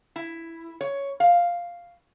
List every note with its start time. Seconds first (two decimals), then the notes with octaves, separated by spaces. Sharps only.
0.16 E4
0.81 C#5
1.20 F5